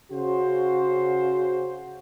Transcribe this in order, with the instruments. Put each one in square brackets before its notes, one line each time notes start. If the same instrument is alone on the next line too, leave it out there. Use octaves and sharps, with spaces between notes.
[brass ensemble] C#3 F#4 C5